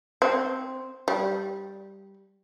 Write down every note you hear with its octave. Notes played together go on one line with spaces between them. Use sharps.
C4
G3